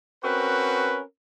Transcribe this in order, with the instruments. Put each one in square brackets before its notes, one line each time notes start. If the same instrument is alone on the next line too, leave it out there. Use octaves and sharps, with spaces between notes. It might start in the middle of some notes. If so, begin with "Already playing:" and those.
[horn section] C4 C#4 F#4 A#4 B4